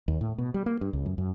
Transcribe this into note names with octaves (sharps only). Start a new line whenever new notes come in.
D#2
A2
B2
G3
A#3
G2
C#2
F#2
F#2